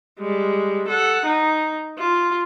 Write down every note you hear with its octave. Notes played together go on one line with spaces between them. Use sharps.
G3 G#3
A4 F#5
D#4
F4